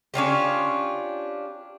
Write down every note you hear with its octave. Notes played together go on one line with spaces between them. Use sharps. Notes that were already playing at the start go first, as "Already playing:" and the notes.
C#4 D4 F4 G4